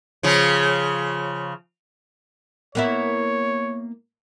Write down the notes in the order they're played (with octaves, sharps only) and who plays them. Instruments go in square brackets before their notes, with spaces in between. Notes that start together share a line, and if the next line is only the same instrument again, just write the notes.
[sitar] C#3 F3
[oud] A#3 B3 E4 [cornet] C#5